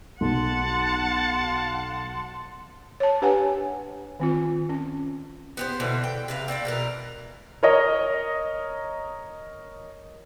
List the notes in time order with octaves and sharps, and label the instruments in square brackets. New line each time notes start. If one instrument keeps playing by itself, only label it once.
[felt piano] B1 [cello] F#5 [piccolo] A5 [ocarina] C6
[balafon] C#5 A5
D4 G4 B4 C#5 F#5 G#5
D#3 C4 F4
C#4
[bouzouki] B3 G4 C5
B2 D3 E3
G5
C3 B4 F5
C4 D5 F#5 G5
B2 E3 A#4
[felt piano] A#4 C#5 D#5